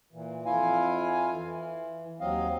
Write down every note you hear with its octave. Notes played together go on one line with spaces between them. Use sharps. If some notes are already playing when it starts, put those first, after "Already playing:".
A#2 E3
F2 E4 F4 F5 G#5
E3
D#2 F#3 C4 D#5 F5